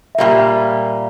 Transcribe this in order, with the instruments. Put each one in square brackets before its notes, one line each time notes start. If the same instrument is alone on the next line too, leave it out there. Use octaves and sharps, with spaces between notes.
[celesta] E5
[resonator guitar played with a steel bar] A#2 G3 A#3 [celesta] F5